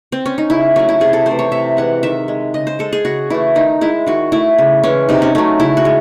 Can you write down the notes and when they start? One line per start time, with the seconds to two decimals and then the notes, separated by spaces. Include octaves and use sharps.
0.12 C4
0.26 C#4
0.38 D#4
0.50 C#3 E4
0.76 F#3 A3 C#4
0.89 E4
1.00 C3 G#4
1.13 A4
1.26 E3 A3 C5
1.39 C#5
1.52 C3 E5
1.77 E3 G#3 F#5
2.03 D#3 E5
2.28 G#3
2.54 C#3 D#5
2.67 C5
2.79 G#3 A4
2.93 G#4
3.05 C#3 F#4
3.30 E3 A3 E4
3.55 D#3 D#4
3.81 G#3 E4
4.06 D#3 F#4
4.32 A3 E4
4.58 C#3
4.83 E3 G#3 C#4
5.09 C3 D#4
5.22 C#4
5.35 F#3 A3 C#4
5.60 C#3 E4
5.77 F#4
5.85 G#3